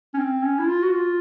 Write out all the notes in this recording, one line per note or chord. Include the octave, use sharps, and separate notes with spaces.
C#4
C4
C#4
E4
F4
F#4
F4